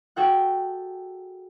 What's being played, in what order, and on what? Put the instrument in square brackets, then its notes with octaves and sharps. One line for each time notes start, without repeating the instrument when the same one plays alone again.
[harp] F#4 G#4 A4 F#5 G5 F#6